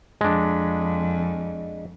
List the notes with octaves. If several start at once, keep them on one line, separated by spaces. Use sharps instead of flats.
F2 G#3 D4